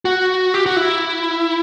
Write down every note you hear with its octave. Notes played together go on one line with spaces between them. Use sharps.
F#4
G4
F#4
E4